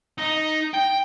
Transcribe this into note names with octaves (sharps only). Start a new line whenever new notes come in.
D#4
G5